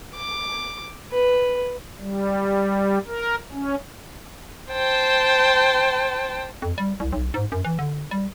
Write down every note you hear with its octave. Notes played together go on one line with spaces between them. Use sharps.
D6
B4
G3
A#4
C#4
C5 G5 A5
F2
G3
C2
B1
G#2
F#2
E3
D3
G3